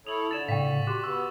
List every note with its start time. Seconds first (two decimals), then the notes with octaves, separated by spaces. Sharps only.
0.07 E4 A4 C#5 D#6 F7 F#7
0.31 D3 F4 D5 A6 E7
0.49 A2 C#3 F5 G5 C#6 B6
0.87 F#4 G4 C6 D6 F#6
1.04 B3 C#6 E6